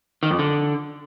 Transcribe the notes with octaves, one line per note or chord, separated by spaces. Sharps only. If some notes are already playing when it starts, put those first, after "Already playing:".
D#3
F2
D3